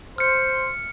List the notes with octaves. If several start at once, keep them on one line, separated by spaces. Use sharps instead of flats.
C5 F6 C#7